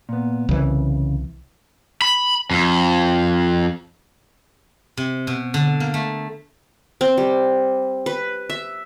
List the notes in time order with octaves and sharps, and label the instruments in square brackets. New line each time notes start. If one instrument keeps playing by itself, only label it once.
[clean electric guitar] A#2 B3
[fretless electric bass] C2 E3 [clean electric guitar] C#3
[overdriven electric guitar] B5
F2
[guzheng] C3
B2
D3
A#3
A3
[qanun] C4
G3
B4
E5